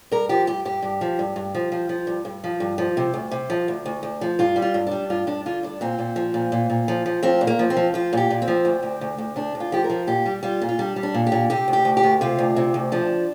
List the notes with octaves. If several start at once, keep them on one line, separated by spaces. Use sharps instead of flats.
G2 A#4
F3 G4
G2 G4
G2 G4
G2
F3
G2
G2
F3
F3
F3
G2
G2
F3
G2
F3
C3
D2
C3
F3
D2
D2
D2
F3
G2 F4
G3
F4
G2
G3 D4
G2 F4
G2 D4
D3 F4
G2 D4
A#2 C4
A#2
F3
A#2
A#2
A#2
F3
F3
F3 C4
A#2
A#3
F3
C4
F3
F3 F4
A#2 G4
A#2
C4
F3
D2
D2
D2
D2
D2 D4
D2
F4
F3 G4
A#4
F3
A#2 G4
G3
G3 F4
A#2
F4
G3 D4
G3
D4
A#2
G4
A#2
C3 G4
D2
G4
D2
G4
D2
C3 F4
D2
C3
D2
F3 D4